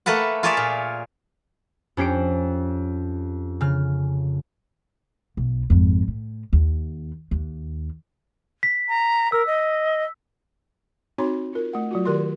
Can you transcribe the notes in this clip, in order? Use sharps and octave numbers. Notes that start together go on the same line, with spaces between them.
A3 A#3 A4 B4 F#5
F4 G#4 A#4 C#5 D5 E5
A#2
F2 C#4 G4 C7 D7
C#3 F6
B1
G#1 F2
A2
D#2
D#2
B6
A#5
A#4 E6
D#5
C4 D#4 F#4 C#5 A#5 C6
F4 A#4
A3 F#5
F#3 F4 F#4
D#3 G4 A#4 D5 C6